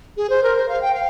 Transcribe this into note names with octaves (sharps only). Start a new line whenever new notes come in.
G#4
C5
A#4
C5
F5
G5
F5